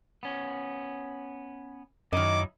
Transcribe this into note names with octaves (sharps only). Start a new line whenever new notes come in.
B3 C#4
F#2 D#3 F#3 D#4 E4 D#5 D6